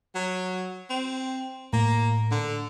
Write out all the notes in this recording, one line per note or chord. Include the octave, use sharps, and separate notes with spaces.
F#3
C4
A2 A#3
D3